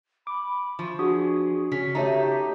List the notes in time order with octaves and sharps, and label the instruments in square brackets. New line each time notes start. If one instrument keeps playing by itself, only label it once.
[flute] B5 [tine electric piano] D6
[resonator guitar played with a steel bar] F3 [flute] C#6
[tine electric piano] D4 [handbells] F#4 D#6 [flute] G#4
[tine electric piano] C#3 B6 [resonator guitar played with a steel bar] C#4
[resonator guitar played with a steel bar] A3 D#4 [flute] G4 [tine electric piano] C#5 A5 A#5